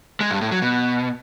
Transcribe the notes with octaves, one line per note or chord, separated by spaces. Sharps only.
G#3
G2
A2
F#3
B2